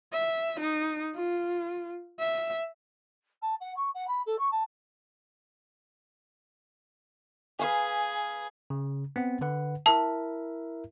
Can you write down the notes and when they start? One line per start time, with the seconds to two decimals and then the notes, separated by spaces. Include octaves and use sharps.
0.13 E5
0.60 D#4
1.15 F4
2.20 E5
3.42 A5
3.60 F#5
3.76 C#6
3.94 F#5
4.07 B5
4.26 A4
4.38 C#6
4.51 A5
7.59 G#4 B4 F5 G#5
8.70 C#3
9.16 B3 C4 F#5
9.41 D3 B4 F#5
9.86 E4 A#4 E5 A5